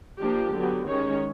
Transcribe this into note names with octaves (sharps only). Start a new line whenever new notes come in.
F3 A#3 D4 G4
D3 F#3 B3
D#3 G#3 C#4 C#5